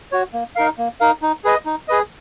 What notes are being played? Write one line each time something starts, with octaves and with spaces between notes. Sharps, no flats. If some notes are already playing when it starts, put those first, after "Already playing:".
F#4 C#5
A#3
D#4 A#4 F5
A#3
D#4 A#4 F5
D#4
G#4 B4 D#5
D#4
G#4 B4 D#5